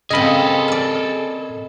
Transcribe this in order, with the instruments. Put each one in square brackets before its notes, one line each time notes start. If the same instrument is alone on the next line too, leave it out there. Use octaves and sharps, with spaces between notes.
[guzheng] C#3 A#3 C4 [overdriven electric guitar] G#4 A4 [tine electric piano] D#5 B5
[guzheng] A#4 D5